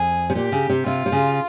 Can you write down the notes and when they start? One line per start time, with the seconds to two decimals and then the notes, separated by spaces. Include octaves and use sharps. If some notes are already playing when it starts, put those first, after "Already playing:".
Already playing: F2 G#4
0.30 C3
0.35 A#2 G4
0.52 C#3
0.70 C3
0.86 C3 F4
1.06 C3
1.12 C#3